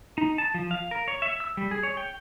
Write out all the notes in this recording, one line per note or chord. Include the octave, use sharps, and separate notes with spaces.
D#4
A5
F3
F5
A#4
C#5
E5
E6
G3
G#4
C#5
G5